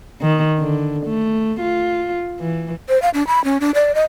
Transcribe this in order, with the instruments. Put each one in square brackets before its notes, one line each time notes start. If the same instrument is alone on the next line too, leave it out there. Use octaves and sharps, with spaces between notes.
[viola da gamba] D#3
D3
A3
F4
E3
[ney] C5
F5
D4
B5
C#4
D4
D5
D#5